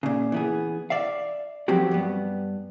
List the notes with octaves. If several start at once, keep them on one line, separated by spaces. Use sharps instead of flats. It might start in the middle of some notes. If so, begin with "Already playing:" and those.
A#2 C#3
E3 B3 G#4
D5 E5 F5
F3 F#3 C4 F#4 G4
G2 B3